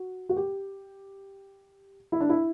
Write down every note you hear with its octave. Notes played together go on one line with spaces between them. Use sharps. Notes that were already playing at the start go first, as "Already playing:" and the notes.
Already playing: F#4
F#4
G4
E4
D4
E4